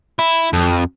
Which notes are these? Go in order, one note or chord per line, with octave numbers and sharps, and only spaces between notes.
E4
F2